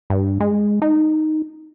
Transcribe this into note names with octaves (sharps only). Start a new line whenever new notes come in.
G2
G#3
D#4